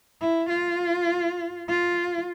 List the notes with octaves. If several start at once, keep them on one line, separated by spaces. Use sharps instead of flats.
E4
F4
F4